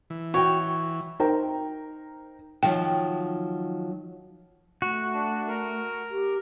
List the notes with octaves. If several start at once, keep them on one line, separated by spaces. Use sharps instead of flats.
E3
F#4 C#5 G5
D#4 A#4 C5 G5 A#5
D#3 F3 F#3 G5
A3 F#4
D4
A#4
G4